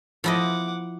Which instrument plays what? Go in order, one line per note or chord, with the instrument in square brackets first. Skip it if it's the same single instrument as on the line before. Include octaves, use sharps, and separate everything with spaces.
[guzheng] F3 E4 D#5 [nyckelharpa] F#5 D6